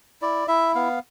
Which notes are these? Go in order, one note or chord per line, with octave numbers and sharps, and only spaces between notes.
E4 D5
E4 E5
B3 F5